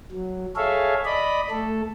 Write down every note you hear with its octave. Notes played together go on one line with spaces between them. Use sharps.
F#3
G#4 A4 C#5 E5 F5
D5 D#5 B5
A3 A4